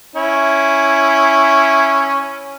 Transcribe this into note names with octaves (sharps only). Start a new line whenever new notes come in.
C#4 E4